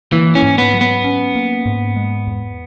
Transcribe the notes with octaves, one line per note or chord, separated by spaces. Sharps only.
E3 A#3
C#4
G#2
B3
F#3
B3
C#4
A#3
G#2
G#3
E2